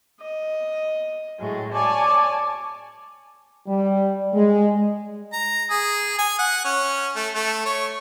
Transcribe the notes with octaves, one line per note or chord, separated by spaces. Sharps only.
D#5
A2 F#3 G#3
C#5 D5 G#5 A5 D6
G3
G#3
A#5
G#4
G#5
F#5
C#4
A3
A3
C#5